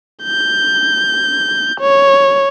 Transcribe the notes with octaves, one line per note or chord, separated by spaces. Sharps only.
G6
C#5